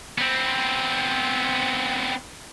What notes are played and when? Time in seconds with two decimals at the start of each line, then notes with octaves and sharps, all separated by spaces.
0.18 B3 C4